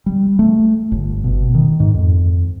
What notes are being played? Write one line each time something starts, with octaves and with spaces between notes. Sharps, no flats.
G3
A3
G1
B2
D#3
G#2
F2